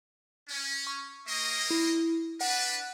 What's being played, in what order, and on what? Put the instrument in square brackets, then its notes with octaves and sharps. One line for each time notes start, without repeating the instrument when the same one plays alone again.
[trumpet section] C#4
[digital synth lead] C#6
[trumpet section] A#3 D#5
[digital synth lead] E4
[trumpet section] D4 B4 [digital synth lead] F#5